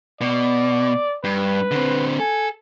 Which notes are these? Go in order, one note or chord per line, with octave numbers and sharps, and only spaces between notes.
B2 D5
G2 B4
D3 C4
A4 G#5